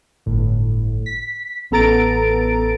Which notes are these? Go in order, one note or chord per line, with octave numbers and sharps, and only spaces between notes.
G1 A2
B6
A1 B3 A4 A#5 A6 D7